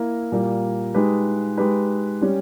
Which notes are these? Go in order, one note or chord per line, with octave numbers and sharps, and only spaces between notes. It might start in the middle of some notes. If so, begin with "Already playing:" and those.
Already playing: A#3 E4 A#4
A#2 G3 A#3
G#3 D#4 G4 B4
G#3 D#4 G4 B4
G3 C#4 G4